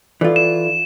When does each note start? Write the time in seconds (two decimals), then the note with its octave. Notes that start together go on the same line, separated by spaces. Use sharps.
0.21 E3 F4 A4 D5
0.36 E7